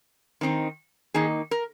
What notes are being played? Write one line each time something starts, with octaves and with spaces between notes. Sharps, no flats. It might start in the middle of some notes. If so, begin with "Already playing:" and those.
D#3 C4 D#4
D#3 A#3 D#4 G#4
A#4